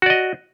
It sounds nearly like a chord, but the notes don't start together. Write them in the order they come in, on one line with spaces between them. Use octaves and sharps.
F#4 D5 D#5